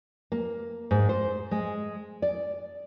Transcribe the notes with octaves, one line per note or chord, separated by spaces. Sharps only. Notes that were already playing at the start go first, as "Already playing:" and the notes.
A#3
G#2
C5
G#3
D5